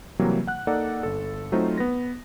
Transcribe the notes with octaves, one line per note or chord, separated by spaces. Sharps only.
C3 E3 F#3 G3 A#3
F#5 F#6
A#3 D#4 A4 D5 F#5
G1 A4
F#3 A3 C4 D#4 F4 C5
B3 B4 A#6